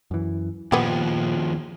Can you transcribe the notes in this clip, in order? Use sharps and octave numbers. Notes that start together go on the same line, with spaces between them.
F#2 E3
D#2 A#2 F3 B3 G4